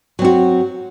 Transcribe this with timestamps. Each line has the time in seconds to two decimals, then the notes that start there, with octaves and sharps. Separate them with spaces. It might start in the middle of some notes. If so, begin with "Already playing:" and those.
0.19 F#3
0.22 C4
0.25 F#4